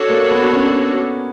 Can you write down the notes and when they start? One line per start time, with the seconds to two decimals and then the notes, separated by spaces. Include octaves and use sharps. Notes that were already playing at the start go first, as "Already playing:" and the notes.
Already playing: D4 F#4 A4 C#5
0.09 A#3
0.31 B3
0.53 C#4